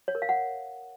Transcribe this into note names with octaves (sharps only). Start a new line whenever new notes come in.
C#5
A#4
F5
F#5